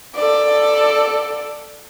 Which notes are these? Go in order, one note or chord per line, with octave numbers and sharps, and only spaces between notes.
A4 D5